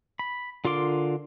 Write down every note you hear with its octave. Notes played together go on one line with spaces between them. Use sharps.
B5
D3 F4 A#4 C6 D6